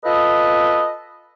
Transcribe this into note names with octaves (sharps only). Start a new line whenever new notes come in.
F4 A4 B4 D#5